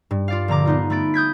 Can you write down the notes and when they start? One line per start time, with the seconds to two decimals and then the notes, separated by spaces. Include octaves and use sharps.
0.11 G2
0.28 F4 D5 F5
0.48 A#1 D3 A#5 D6
0.65 B3 D#4 F4
0.90 A3 B3 B5 A6 D7
1.14 D#6 G6 G#6 B6